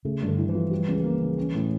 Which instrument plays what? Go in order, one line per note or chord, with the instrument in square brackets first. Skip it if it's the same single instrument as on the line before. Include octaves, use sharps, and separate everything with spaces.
[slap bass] C#3 [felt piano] A3
[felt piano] G2
[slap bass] D3
[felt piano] E4
[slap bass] E3
[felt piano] F3
G3
C#2
A#3
C#3
C#4
A2